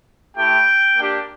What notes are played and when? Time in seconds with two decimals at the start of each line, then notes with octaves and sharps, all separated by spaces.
0.36 A3 E4 G4 G5
0.96 A#3 D4 G4